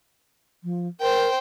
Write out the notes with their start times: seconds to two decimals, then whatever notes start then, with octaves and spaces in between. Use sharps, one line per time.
0.64 F3
1.01 A#4 C5 G5